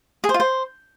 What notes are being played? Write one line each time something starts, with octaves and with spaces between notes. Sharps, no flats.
G#4
C5
F4
C5